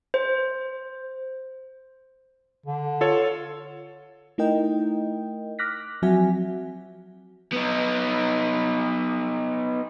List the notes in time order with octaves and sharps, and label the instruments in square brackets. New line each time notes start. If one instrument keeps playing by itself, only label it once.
[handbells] C5
[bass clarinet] D3
[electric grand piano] F4 A4 C#5
[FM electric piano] A3 D#4 E4 A#4 D#5 G5
D6 F6 F#6 A#6 B6
F3 F#3 C4 F#4 E5 G#5
[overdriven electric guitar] B3 D#4